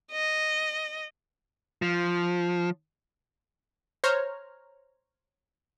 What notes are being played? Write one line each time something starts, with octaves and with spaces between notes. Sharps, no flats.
D#5
F3
C5 C#5 A#5 F6